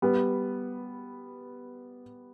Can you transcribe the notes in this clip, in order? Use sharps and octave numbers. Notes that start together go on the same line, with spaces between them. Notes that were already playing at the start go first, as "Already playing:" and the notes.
G3 B3